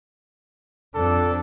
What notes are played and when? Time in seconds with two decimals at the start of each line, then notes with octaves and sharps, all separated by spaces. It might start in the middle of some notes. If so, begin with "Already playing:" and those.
0.95 F2 D4 A4